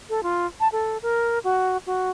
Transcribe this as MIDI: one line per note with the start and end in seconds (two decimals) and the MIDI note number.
0.09 0.23 69
0.23 0.46 65
0.60 0.68 81
0.72 0.98 69
1.03 1.39 70
1.44 1.77 66
1.86 2.11 66